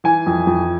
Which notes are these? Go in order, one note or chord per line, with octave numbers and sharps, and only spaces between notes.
E3 G#5
F2
F2